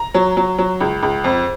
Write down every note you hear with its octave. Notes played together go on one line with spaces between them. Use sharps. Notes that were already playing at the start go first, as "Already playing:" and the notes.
Already playing: A#5
F#3
F#3
F#3
C#2
C#2
F2